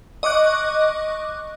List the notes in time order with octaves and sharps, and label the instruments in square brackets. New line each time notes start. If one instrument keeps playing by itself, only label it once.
[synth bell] D#5 C#6 D6 F#6